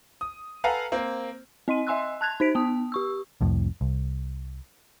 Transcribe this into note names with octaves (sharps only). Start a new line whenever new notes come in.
D#6
A4 B4 F5 F#5 G#5 A#5
A#3 C4
C4 D#5 C6 D#7
D#5 E5 G#5 C6 E6 F#6
A5 F#6 G#6 F7
D#4 C5 B6 D7
B3 A5 D#6
G4 C#6 E6
C2 F2 A2
C2